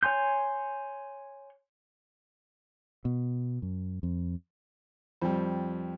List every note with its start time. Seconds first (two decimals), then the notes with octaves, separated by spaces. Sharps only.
0.03 C#5 G#5 C6 G6
3.05 B2
3.62 F#2
4.03 F2
5.22 F2 G3